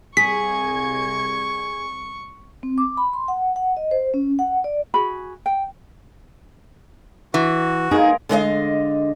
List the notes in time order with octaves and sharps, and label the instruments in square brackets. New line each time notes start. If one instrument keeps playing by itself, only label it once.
[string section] C2 G#6 [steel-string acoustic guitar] G#4 [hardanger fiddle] C#6 [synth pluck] B6
[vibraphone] C4
D6
B5
C6
F#5
F#5
D#5
C5
C#4
F#5
D5
[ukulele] F#4 G#4 B5
G5
[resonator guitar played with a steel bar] E3 [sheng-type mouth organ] F#4
[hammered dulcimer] G#3 A#3 A#4 [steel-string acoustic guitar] D#4 G#4
[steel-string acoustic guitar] D3 G#3 D#5 F5